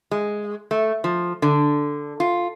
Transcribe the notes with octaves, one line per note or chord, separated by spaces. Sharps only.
G#3
A3
F3
D3
F4